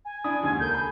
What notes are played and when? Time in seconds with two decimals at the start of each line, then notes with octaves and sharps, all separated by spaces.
0.05 G#5
0.24 D4 E4 D#6
0.43 D#2 G#2 D3
0.59 C#2 A4 A#4 G6
0.74 G#5 B5